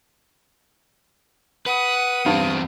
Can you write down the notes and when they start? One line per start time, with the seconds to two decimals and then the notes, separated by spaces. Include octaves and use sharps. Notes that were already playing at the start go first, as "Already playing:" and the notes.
1.66 B4 F#5 D#6
2.26 E2 G2 C4